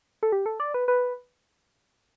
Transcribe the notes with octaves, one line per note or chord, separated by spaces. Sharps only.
A4
G4
A4
D5
B4
B4